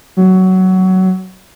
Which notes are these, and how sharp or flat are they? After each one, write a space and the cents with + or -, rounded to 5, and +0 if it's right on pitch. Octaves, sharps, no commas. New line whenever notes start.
F#3 +15